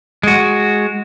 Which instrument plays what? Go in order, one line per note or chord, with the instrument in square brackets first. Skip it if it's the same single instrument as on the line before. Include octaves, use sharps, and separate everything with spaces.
[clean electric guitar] G#3 F#4